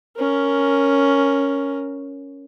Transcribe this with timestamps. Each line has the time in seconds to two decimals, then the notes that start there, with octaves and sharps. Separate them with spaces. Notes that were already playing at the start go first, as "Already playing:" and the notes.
0.17 C#4 A#4